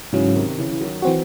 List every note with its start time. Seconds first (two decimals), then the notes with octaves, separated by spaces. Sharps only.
0.13 G#2 C#3 E3 F#3 C#4
0.35 C3 D#3
0.58 C#3 E3
0.71 E3
0.81 D#3 F#3
1.02 E3 C4 F#4